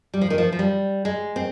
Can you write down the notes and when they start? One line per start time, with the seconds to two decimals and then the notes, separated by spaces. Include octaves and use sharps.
0.14 G3
0.21 F3
0.30 D#3
0.38 F3
0.52 F3
0.59 G3
1.05 G#3
1.36 C4